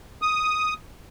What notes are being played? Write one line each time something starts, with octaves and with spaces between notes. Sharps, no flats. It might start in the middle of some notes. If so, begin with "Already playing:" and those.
D#6